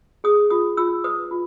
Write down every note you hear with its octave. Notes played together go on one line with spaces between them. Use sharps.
G#4 D#6
F4 D#6
F4 E6
B4 D#6
F4